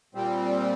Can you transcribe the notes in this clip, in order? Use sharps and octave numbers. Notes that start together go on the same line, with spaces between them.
A#2 G3 C4